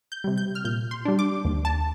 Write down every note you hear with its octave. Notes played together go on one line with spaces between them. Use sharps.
G6
C3 G3
G6
F6
A#2 G6
C6
G3 D4
D6
D#2
A5